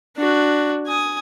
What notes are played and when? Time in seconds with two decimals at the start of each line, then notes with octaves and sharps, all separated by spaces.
0.17 D4 F#4
0.87 G#5 D#6